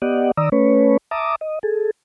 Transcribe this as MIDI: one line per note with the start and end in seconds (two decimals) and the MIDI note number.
0.02 0.31 59
0.02 0.31 67
0.02 0.31 74
0.02 0.31 75
0.02 0.31 78
0.37 0.49 51
0.37 0.49 74
0.37 0.49 82
0.37 0.49 87
0.37 0.49 88
0.52 0.97 57
0.52 0.97 61
0.52 0.97 71
0.52 0.97 73
1.11 1.35 76
1.11 1.35 81
1.11 1.35 82
1.11 1.35 86
1.11 1.35 87
1.41 1.59 75
1.63 1.91 68
1.63 1.91 69